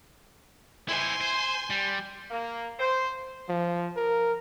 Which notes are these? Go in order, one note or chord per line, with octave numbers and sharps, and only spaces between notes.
E4 C5 G#5 C6
C5
G3
A#3
C5
F3
A#4